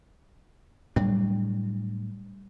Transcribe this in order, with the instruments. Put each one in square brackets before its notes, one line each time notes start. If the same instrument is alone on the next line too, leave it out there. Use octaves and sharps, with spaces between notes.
[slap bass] A2 F#3 D4 [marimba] G3